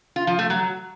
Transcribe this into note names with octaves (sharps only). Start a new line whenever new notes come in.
F4
F3
A3
F#3